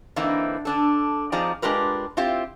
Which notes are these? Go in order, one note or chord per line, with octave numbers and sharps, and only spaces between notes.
D3 E3 A#3 C4 D#4 E4
D3 D4 A4
F2 F3 D#4 G#4 D5 A#5
G#3 D4 F4 G4 A#4 B4
C4 E4 F4 G4